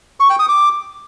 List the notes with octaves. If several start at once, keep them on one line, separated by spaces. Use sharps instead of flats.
C#6
G5
D#6
D6